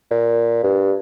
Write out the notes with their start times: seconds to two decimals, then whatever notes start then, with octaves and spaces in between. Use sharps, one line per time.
0.11 A#2
0.64 G2